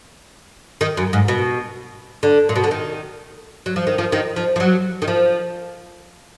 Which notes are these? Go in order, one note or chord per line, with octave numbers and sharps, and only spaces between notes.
D#3
F#2
G#2
B2
D3
A#2
B2
D3
D#3
F#3
F3
D#3
F3
D#3
F3
F3
F#3
D#3
F3